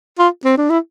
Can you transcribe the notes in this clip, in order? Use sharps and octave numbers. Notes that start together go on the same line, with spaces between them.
F4
C4
D4
E4